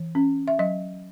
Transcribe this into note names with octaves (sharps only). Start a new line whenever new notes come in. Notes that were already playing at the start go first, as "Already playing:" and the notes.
Already playing: E3
C#4
E5
F#3 D#5